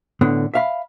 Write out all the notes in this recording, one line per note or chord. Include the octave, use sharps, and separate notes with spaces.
A2 D3 B3
E5 F5 B5